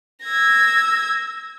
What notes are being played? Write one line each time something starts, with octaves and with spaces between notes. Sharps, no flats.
E6 G#6 A#6